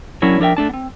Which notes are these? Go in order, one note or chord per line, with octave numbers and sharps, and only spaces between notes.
F#3 C#4 D4 E4 A#4 C#5
F3 D4 A#4 E5 G5
A3 D4 A5
B3 C4